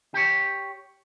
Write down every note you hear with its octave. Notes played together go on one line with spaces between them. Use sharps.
G4 C#5